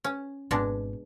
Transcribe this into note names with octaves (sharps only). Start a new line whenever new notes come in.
C#4
G#1 B2 G#3 D4